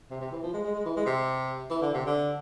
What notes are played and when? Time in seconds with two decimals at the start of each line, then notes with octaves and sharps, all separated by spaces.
0.10 C3
0.21 C3
0.32 E3
0.43 F3
0.54 G#3
0.65 G#3
0.75 G#3
0.86 E3
0.97 G#3
1.06 C3
1.70 E3
1.82 D3
1.94 C3
2.06 D3